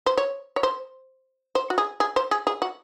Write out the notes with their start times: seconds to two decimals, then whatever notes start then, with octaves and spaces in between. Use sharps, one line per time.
0.06 C5
0.17 C#5
0.56 C#5
0.63 C5
1.55 C5
1.70 F#4
1.78 G#4
2.00 G#4
2.16 C5
2.31 G#4
2.47 G#4
2.62 F#4